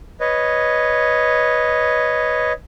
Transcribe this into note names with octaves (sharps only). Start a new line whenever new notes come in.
B4 C#5 D#5